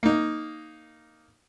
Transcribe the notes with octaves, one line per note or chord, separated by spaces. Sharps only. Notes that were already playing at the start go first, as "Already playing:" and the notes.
A#3 D#4